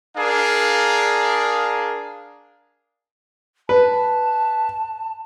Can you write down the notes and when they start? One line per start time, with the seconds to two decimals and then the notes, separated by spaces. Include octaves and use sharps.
0.17 D4 G#4 A#4 F5
3.69 B4 A5